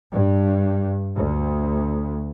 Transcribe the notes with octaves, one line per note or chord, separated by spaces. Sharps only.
G2
D2